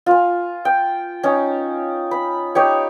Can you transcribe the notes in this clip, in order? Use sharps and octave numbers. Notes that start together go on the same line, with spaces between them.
F4 G#5
G5
C#4 D#4
B5
D#4 G4 C#5